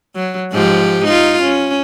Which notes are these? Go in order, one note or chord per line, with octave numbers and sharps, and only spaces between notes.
F#3
G#2 F3 G4
D#4 F4
C#4